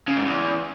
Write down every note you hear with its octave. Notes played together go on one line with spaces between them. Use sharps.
C#3
G#2
E2